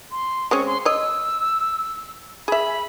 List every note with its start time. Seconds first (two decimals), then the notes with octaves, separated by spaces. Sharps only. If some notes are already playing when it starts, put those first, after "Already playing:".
0.11 C6
0.51 G#3 C4 C#4 C#6
0.67 C6
0.85 C#5 D#5 E6
2.48 G#4 E5 B5